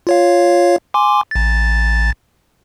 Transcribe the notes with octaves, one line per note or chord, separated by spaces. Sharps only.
F4 C#5 F5
G#5 C6 D6
A1 A6